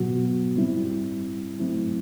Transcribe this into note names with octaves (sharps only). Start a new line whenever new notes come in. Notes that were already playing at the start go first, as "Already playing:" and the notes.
Already playing: B2 F#3 B3 F#4
G3 C4 E4
F#3 A3 C4 E4